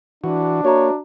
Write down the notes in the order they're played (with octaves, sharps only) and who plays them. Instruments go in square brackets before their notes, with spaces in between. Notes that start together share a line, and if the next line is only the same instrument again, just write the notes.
[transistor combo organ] E3 F#4 [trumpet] D4
[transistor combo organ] A#3 [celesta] F#4 E5 A#5 [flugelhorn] C#5